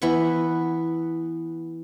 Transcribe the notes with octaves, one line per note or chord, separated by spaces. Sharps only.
E3 B3 E5 C#6